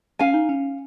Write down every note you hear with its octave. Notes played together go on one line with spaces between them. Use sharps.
C#4 F5 G#5
D#4
C#4